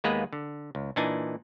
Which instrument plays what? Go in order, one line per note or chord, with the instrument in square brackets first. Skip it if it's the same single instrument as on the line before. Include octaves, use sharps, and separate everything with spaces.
[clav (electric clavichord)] D#2 G#3 A#3 B3 G#4 B4
D3
C#2
A#2 E3 D4 D#4 G#5